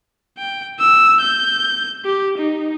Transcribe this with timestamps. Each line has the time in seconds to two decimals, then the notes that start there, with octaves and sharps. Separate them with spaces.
0.38 G5
0.79 E6
1.21 G6
2.05 G4
2.38 D#4